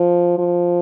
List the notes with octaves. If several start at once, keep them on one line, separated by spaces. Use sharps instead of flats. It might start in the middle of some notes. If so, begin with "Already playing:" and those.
Already playing: F3
F3